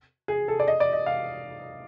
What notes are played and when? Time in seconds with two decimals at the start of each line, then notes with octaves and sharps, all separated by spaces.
0.28 G#4
0.48 A4
0.60 D5
0.68 D#5
0.80 D5
0.93 D#5
1.06 F5